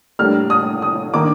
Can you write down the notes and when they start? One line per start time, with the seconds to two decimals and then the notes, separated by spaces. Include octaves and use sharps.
0.19 A2 G3 A#3 D4 F6
0.50 D#6
0.82 D#6
1.13 D#3 A#3 D4 D6